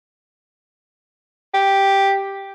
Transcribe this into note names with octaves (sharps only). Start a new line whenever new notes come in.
G4